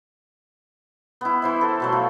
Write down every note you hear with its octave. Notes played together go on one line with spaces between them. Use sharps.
B3 E4
E3 C5 E5
A4
B2 F#3 A3
F3